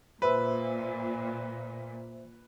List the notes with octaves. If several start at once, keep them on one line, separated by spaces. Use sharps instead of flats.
A#2 B4 C5 E5 E6